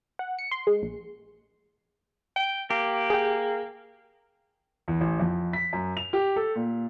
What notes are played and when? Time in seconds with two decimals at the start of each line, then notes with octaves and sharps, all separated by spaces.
0.19 F#5
0.39 C#7
0.51 C6
0.67 G#3
0.82 A#1
2.36 G5
2.70 A#3 G4
3.10 G#4 G5
4.88 E2
5.01 A1
5.20 F2
5.53 B6
5.73 F#2
5.97 F7
6.13 G4
6.36 A4
6.55 A#2